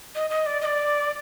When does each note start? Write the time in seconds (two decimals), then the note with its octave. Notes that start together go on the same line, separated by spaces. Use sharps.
0.15 D#5
0.30 D#5
0.46 D5
0.62 D#5
0.66 D5